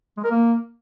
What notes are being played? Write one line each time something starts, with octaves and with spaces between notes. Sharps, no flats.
G#3
A#4
A#3